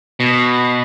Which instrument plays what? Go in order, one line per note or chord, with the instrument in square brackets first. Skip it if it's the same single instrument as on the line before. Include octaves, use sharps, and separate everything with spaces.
[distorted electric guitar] B2